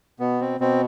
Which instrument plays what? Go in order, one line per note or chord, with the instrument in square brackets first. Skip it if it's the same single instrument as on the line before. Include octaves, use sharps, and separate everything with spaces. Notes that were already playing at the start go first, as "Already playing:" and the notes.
[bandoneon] B2 B3
C4
B2 C4